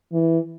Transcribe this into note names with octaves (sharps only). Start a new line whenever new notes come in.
E3